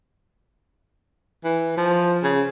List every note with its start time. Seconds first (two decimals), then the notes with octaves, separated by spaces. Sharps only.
1.44 E3
1.77 F3
2.23 C#3